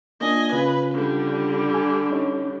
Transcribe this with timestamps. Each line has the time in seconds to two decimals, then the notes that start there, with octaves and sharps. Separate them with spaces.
0.21 A#3 D4 F4 D#5 G#5
0.52 C#3 C#4 F4 B4
0.94 D3 G3
1.74 G#5
2.10 C#4 D#4 C#5